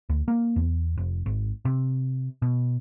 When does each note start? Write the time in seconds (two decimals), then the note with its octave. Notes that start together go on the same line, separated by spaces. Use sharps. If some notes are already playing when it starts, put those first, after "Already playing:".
0.10 D2
0.28 A#3
0.56 E2
0.98 F1
1.26 G#1
1.65 C3
2.42 B2